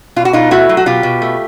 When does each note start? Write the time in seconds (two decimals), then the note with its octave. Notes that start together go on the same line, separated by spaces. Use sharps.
0.16 B2 F4
0.25 F#4
0.33 B2 D#4 F4
0.51 A3 E4 F#4
0.69 F#3
0.77 F#4
0.86 B2 F4 G4
1.03 B2
1.22 A3